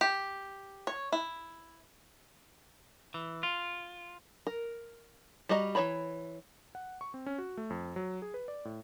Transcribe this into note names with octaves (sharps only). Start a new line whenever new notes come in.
G4
C#5
E4
E3
F4
A#4
G3 F#4 D#5 A#5
E3 F3 C#5 A#5 B5
F#5
C#6
C4
C#4
F#4
A3
F2
F#3
G#4
B4
D5
A2